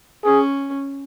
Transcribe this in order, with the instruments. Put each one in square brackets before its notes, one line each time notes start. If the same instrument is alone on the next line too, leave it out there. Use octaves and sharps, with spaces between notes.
[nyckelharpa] C#4 [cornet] G#4